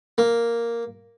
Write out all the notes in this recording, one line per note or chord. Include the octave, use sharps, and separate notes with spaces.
A#3